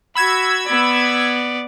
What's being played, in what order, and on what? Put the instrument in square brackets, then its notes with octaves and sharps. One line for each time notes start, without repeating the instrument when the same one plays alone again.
[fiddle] F#4 [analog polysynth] B5 E6 G#6
[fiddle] B3 D5